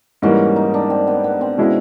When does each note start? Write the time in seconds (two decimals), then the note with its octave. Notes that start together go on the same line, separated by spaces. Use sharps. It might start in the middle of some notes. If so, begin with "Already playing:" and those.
0.22 G#2 E3 G3 A#3 C#4
0.56 D#4
0.74 D4
0.90 C4
1.07 B3
1.24 B3
1.41 C4
1.58 B2 G#3 C#4 E4